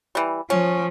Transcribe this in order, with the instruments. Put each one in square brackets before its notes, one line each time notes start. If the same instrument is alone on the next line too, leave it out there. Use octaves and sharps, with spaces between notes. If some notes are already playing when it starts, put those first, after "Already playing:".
[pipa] E3 G3
[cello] F3 [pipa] C#4